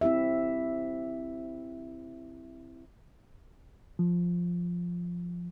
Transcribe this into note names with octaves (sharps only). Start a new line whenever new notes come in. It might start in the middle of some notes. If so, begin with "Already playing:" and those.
C4 E4 G4 E5
F3